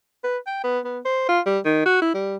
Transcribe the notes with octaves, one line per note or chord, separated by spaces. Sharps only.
B4
G5
B3
B3
C5
F4
G3
D#3
F#4
E4
G3